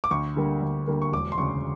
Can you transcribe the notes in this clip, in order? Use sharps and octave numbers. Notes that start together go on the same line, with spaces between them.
D6
D2 C#6
D3 G3 A#3
D2
D3 G3 A#3
C#6
E1 D6
C6
D2 C#3 C#6